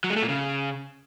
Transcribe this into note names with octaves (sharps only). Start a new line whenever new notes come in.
F#3
G#3
A3
A#2
C#3